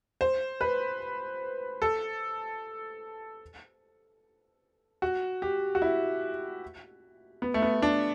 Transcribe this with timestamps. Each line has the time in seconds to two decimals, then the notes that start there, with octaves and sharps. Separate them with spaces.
0.21 C5
0.61 B4
1.82 A4
5.02 F#4
5.42 G4
5.75 F#4
5.82 E4
7.42 B3
7.54 A3
7.62 B3
7.82 D4